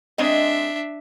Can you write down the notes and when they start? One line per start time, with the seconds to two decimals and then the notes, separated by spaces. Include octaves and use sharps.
0.18 G#3 C4 D4 D#5 E5